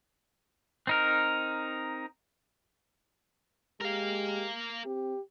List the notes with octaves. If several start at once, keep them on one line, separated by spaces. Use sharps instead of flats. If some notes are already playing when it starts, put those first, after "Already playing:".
C4 D#4 A#4
G#3 G4 A#4 F5
C4 G4